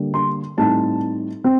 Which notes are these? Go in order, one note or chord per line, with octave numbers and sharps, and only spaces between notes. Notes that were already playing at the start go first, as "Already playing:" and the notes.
Already playing: D3 G3 A#3 D4
C6
A2 G3 C4 D#4 A5
C4